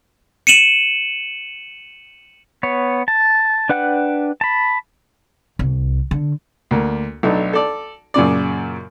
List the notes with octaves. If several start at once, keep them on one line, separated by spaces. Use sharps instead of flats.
C#7 D#7 E7 F#7
B3 C#5
A5
D4 B4 F#5 G5 F#6
A5 B5
C2
D3
D2 A#3
B1 A3 D4 D#4
A4 D5
F#2 A#2 C#3 D5